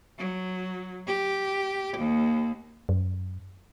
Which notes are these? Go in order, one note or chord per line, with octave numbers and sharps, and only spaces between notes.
F#3
G4
D#2
F#2